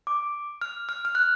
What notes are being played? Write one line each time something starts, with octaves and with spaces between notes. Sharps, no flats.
D6
F6
F6
F6
F#6